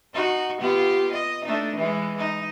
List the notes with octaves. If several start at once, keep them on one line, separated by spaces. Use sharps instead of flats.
D#4 F#4
B3 F4 G4
D#5
A3 D4 D#4
E3 G#3
D#4